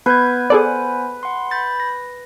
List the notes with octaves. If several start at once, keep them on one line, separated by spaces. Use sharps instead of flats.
B3 B4 G6 G#6
B3 G#4 A4 C5 D5 G#5
F#5 C6
B5 G6 A6
A#6